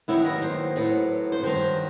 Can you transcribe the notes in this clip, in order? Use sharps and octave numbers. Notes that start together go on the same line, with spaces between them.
D#2 D#3 F#3 B3 E4
D#5
C5
A2 F#3 B3
C5
G2 D#3 F#3 C5